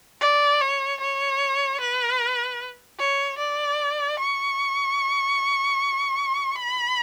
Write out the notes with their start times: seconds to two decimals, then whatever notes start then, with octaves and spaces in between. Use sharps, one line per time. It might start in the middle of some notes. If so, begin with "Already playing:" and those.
0.21 D5
0.62 C#5
1.01 C#5
1.81 B4
2.99 C#5
3.38 D5
4.19 C#6
6.56 B5